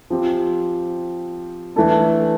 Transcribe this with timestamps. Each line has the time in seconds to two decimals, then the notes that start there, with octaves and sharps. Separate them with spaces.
0.10 F3 C4 G4
1.76 E3 A3 D4 A4